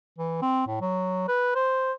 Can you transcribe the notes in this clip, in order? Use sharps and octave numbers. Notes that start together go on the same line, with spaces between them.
E3
C4
A2
F#3
B4
C5